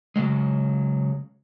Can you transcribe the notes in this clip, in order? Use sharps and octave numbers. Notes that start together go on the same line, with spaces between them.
C#3 F#3 G#3